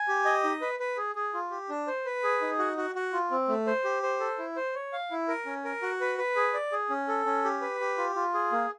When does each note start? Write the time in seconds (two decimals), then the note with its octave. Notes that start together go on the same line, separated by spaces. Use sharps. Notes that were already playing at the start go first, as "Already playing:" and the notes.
Already playing: G#5
0.08 G4
0.25 D#5
0.44 D#4
0.61 B4
0.79 B4
0.97 G#4
1.15 G#4
1.34 F4
1.51 G4
1.69 D4
1.87 C5
2.05 B4
2.24 G#4
2.41 D#4
2.59 F#4
2.77 F#4
2.95 F#4
3.13 F4
3.31 C4
3.48 A3
3.66 C5
3.84 G4
4.03 C5
4.20 A4
4.38 E4
4.56 C5
4.75 C#5
4.93 F5
5.11 E4
5.28 A#4
5.46 C#4
5.65 A#4
5.82 F#4
6.01 B4
6.18 B4
6.36 G#4
6.54 D5
6.72 G#4
6.90 C#4
7.08 A4
7.26 C#4
7.45 G4
7.61 B4
7.80 G4
7.97 F4
8.16 F4
8.34 G#4
8.52 A#3